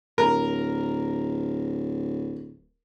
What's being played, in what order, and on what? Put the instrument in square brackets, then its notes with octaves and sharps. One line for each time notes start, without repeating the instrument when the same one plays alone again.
[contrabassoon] D1 [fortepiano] A#4